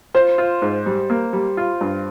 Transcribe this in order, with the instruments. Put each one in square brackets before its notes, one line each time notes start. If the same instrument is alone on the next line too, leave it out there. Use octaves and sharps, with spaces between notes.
[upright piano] F4 [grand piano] C5
[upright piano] F4
G#2
G3
A#3
G3
F4
G2